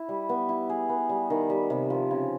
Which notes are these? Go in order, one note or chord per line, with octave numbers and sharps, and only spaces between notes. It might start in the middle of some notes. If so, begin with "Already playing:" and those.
Already playing: E4
G3
B3
E4
G#4
B3
G3
D#3
G3
C3
F3
C#3